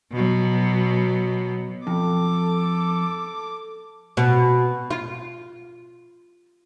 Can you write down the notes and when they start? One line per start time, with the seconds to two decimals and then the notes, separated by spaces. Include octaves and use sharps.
0.12 B2 F#3
1.87 F2 A4 D6
4.17 B2
4.91 F4